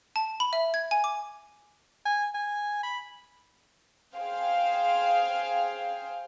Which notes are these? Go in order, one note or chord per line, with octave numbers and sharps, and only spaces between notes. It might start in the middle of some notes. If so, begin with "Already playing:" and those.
A5
B5
E5
G#6
G#5
D6
G#5
G#5
B5
G#4 C5 F5 G5